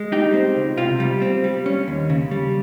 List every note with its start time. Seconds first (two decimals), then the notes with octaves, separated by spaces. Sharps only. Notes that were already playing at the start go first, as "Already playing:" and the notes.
Already playing: G#3
0.12 G3 D#4 G4
0.34 C4
0.56 C#2
0.78 C3 F4
1.00 G3
1.22 C4
1.44 G3
1.66 C#4
1.88 D#2
2.10 C#3
2.31 G3